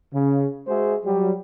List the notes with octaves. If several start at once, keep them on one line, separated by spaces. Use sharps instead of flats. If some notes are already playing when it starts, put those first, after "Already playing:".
C#3
G#3 F#4 G#4 C5 E5
F#3 G3